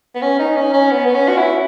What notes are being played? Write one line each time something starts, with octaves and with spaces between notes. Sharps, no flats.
B3
C#4
D#4
C#4
C#4
B3
B3
C#4
F#4
E4